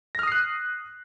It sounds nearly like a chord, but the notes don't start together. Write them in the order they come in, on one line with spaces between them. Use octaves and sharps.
A#6 F6 D#6 C7 F#6